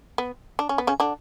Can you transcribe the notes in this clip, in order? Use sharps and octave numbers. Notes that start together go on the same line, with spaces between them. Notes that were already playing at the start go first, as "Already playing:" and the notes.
B3
D4
C#4
B3
C#3 C#4
D3 D4